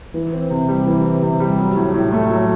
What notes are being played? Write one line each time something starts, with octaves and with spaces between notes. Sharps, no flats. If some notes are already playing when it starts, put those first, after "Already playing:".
E3
C4
C3
G3
E3
C4
C3
G3
F#3
A2
A2
A3
F#3